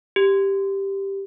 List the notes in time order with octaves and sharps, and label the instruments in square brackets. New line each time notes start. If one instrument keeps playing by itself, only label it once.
[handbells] G4